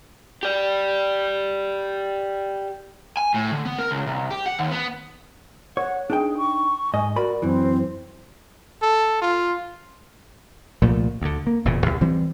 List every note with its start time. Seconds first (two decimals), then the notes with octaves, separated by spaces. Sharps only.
0.43 G4 D5
3.17 G#5
3.34 A2
3.52 D3
3.65 B3
3.79 A#4
3.91 C#2
4.06 C2
4.31 G4
4.46 F#5
4.59 D#2
4.71 B3
5.77 C#5 F#5
6.10 D4 D#4 G#4 G5
6.37 C#6
6.94 G#2 D#5 G#5
7.16 F#4 A#4 D5 B5
7.42 F#2 E3 C4
8.82 A4
9.21 F4
10.82 C2 A#2 F3 A3
11.22 D2 D3
11.47 A#3
11.65 E1 E2 A#2 C#3
11.86 C2
12.01 E3 G3 C4